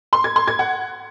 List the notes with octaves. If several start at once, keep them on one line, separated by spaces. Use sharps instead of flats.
C6
G#6
C6
G#6
F#5